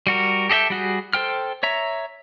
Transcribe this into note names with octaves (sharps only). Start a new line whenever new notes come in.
G3 F#4 A#4
G4 A4 D#5 E5 G5
G3 F#4 G#4
A4 C5 G5 F6
C#5 E5 A#5